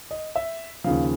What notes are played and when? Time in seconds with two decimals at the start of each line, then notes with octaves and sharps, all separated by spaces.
0.11 D#5
0.36 E5
0.84 D#2 C#3 F3 F5